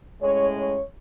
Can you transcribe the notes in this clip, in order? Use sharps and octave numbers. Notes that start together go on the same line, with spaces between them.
A2 G#3 C#4 C#5
C#5